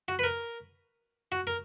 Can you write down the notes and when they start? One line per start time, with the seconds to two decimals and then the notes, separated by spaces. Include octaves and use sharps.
0.08 F#4
0.19 B4
0.24 A#4
1.32 F#4
1.47 A#4